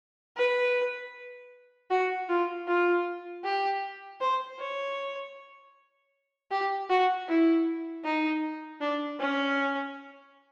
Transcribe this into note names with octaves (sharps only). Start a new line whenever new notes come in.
B4
F#4
F4
F4
G4
C5
C#5
G4
F#4
E4
D#4
D4
C#4